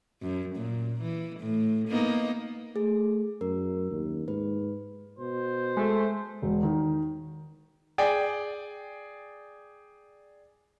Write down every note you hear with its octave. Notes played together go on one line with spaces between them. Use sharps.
F#2
A#2
E3
A2
A#3 B3 D#4
A3 G#4
F#2 A#4
D#2
G#2 B4
B2 C5
G#3 A3
E1
D#3
G#4 D5 G5